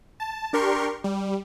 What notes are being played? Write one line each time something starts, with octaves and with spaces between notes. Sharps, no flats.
A5
D4 G4 A#4 C6 C#6
G3